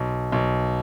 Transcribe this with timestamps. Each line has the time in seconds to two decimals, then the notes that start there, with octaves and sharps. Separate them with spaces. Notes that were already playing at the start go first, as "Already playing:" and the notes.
Already playing: B1
0.32 B1